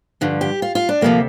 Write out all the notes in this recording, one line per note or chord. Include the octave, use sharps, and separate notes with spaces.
G2 D3 F3
G4
F4
F4
D4
D2 C3 F3 A#3